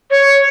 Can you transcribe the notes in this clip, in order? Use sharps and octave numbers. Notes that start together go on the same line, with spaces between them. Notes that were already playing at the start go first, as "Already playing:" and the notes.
C#5